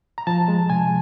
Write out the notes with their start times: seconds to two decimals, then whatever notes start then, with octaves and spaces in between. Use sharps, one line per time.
0.18 A#5
0.27 F3 A5
0.48 G#3
0.70 C3 G#5